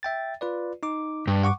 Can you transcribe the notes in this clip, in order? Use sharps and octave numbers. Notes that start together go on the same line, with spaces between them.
E5 G5 A6
F4 B4 D5
D#4 D6
G2
F#5 C#6 D6